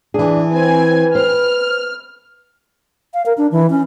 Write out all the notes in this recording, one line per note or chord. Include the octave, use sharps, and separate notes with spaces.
E3 D4 G#4
C4 B4 G#5
C5 F6
F5
A#4
D4
E3
C#4